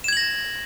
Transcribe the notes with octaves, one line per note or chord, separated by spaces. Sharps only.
G#6 A#6 E7 F#7